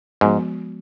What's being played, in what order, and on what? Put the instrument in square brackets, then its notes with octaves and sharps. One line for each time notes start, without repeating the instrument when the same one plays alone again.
[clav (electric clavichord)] G#2 [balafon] F3 G#3 B3 F#4